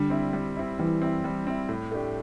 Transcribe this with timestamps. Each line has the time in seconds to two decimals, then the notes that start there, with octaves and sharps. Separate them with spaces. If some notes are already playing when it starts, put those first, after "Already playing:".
Already playing: D3 G3
0.10 C4 E4
0.33 G3
0.56 C4 E4
0.79 E3 G3
1.02 C4 E4
1.24 G3
1.47 C4 E4
1.69 A2
1.91 A3 D4 G4